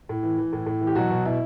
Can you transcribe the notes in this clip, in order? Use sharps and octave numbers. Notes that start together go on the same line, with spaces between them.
A2
E3
E3
A2
A2
E3
G4
B2 F#3 F#4
B2
B2 E4